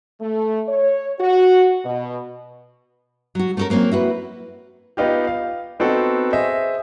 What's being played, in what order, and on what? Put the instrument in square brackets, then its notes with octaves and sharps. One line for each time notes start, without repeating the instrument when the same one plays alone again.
[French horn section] A3
C#5
F#4
B2
[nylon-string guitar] F#3 F#4
A3 C#4 D#4 A4 A#4
F#3 A#3 C4 C#4
E4 F#4 B4
[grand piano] B3 D#4 F4 G4
F5
B3 C4 D#4 F#4 A4
G#4 C5 D#5 E5